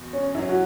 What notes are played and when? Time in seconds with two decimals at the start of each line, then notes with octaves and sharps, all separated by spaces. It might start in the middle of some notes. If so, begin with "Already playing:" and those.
Already playing: E2 B2
0.13 C#4
0.34 F#2 F#3 C#4 E4
0.49 F#4